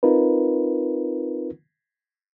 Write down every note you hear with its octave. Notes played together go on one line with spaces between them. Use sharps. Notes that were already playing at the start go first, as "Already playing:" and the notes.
C4 D#4 F4 A#4 B4